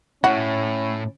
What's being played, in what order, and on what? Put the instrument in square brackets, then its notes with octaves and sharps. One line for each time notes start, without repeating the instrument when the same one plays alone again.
[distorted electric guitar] A2 [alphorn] C#4 [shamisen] F#4